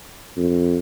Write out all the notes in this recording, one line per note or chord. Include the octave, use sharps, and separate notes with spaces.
F2